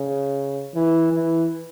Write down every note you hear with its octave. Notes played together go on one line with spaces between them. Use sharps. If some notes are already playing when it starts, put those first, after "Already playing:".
Already playing: C#3
E3
E3